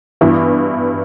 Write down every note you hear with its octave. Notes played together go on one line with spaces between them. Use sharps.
G2 E3 B3 E4